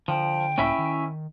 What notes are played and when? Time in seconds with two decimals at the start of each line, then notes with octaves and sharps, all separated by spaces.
0.08 D3 F3 G5
0.58 C#2 A2 A#3 C#4 E4 E5
0.78 D#3